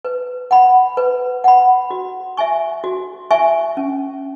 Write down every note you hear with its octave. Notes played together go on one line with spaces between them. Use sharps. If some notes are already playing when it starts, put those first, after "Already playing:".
B4
F#5 B5
B4
F#5 B5
F#4
E5 G#5 C#6
F#4
E5 G#5 C#6
C#4